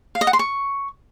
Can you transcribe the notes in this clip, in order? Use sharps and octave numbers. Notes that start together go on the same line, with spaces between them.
F5
D#5
F#5
C6
C#6